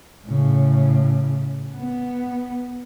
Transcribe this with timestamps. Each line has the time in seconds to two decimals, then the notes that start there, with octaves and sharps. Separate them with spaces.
0.25 A2 C#3
1.75 B3